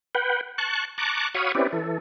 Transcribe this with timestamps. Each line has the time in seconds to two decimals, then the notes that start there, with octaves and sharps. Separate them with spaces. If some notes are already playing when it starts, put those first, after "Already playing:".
0.15 B4 F#5 G5
0.58 A5 C#6 F#6
0.98 A5 A#5 C#6 D6 F#6
1.35 F#4 C#5 F5 B5 C#6 D#6
1.55 C4 C#4 E4 G4 B4 D5
1.73 E3 A4